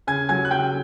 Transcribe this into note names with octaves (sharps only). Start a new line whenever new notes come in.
C#3 G#5 G#6
F#3 G#5 G#6
F#6
C#3 G5 G6